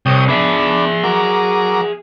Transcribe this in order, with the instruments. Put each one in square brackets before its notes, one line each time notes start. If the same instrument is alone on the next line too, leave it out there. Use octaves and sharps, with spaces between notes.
[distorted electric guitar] C2 [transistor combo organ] C#5 G5 D#6
[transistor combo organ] B3 D4 [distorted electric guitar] G#4 E5
[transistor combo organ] F#3 A#4 D6